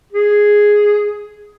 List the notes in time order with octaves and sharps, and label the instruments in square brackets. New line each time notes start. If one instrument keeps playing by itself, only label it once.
[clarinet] G#4